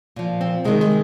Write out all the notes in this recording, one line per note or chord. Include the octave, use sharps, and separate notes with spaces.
A#2 F3
C4
C3 D#3 G#3
G#3